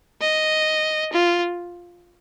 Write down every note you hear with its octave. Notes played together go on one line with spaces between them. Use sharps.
D#5
F4